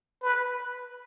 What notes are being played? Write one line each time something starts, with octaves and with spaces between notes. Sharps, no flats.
B4